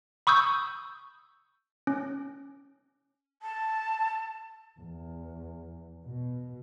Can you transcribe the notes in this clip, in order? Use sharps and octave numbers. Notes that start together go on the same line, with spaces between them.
B5 C#6 D#6 E6 G6
C#4
A5
E2
B2